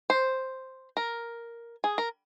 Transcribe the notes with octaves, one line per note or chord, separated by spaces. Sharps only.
C5
A#4
G#4
A#4